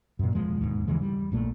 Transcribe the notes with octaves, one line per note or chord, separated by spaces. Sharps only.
F#2 A#2
E1 F3 G#3
E1 D#2 G#2
D#2 C#3 E3 G#3
G3
A#1 A#2 A3